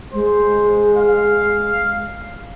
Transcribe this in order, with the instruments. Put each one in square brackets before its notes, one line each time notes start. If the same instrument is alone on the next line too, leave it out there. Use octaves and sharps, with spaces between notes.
[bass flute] G#3 [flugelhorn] C5
[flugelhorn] F5